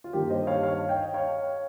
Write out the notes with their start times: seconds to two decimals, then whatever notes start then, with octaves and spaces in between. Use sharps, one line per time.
0.04 F4
0.13 G2 D#3 G3 A#3 D#4 G4
0.30 C5 D#5
0.47 C#5 F5
0.63 C#5 F5
0.89 D#5 G5
1.14 C#5 F5